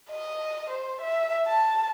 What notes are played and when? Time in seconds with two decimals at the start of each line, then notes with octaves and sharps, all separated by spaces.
0.11 D#5
0.70 C5
1.01 E5
1.47 A5